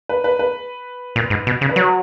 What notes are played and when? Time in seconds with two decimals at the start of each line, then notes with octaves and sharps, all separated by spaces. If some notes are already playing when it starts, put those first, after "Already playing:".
0.09 B4
0.24 B4
0.39 B4
1.16 A#2
1.30 G#2
1.47 B2
1.61 C#3
1.69 B4
1.76 F#3 C#5